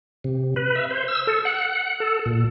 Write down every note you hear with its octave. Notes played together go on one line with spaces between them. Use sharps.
C3
B4
E5
C5
E6
A4
F#5
A4
A#2